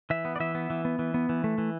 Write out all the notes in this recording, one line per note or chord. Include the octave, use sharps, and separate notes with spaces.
E3 E5
B3
D5
E3 E5
B3
E3
B3
E3
B3
E3
A3
E3